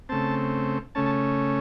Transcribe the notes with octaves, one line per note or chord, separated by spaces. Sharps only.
C#3 A3 C4 A5
C#3 A3 C#4 A5
A5